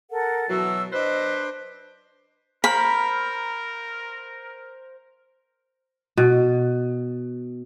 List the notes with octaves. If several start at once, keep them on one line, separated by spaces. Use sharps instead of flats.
A4 A#4 F#5
B2 E3 F#3 E6
D4 B4 C5 D#5
A#4 C5 F5 A#5 B5
B2